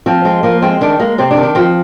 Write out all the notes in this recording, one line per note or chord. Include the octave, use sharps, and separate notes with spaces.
F3 C4
G#3 C4
F3 A#3
G#3 C4
D#3 D4
G#3 A#3
C3 C4
D4
D#3
D4
F3 C4